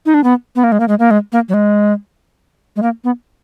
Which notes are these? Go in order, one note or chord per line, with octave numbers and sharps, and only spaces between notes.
D#4
D4
B3
B3
A#3
G#3
A#3
G#3
A#3
G#3
A#3
F#3
G#3
G#3
A#3
B3